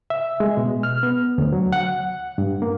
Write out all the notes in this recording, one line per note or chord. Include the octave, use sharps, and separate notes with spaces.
E5
G#3
B2
F6
B3
D2
F#3
F#5
G2
A#3